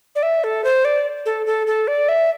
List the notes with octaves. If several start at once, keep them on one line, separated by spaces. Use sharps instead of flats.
D5
E5
A4
C5
D5
A4
A4
A4
D5
E5